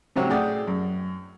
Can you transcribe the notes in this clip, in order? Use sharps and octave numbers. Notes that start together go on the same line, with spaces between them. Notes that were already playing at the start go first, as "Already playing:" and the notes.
G#2 C3 F#3 C4 F#4
A2 G#4 D5 F#5 G5 D#6
F#2